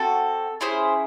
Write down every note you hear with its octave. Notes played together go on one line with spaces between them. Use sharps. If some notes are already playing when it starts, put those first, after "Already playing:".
Already playing: C4 F#4 A4
C#4 E4 G#4 C5